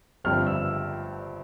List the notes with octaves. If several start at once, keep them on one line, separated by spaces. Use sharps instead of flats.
G1 G2 F3 C4 F6
E6